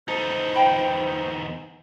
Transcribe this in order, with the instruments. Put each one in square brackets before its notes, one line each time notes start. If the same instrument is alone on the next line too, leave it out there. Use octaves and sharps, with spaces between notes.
[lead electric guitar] E2 D#4 [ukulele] A4 [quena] C5
[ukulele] F5 G5 B5